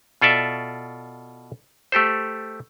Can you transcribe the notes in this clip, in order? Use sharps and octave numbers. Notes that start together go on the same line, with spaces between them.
B2 F4 A4 D5 E5
A3 G4 A4 C5